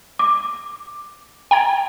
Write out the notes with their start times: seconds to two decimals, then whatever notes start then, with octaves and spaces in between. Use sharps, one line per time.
0.19 D6
1.51 G5 A#5 G#6